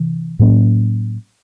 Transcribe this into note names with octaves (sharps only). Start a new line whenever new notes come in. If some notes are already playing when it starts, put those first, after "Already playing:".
Already playing: C3 E3
A2 F#3 A#3 C#4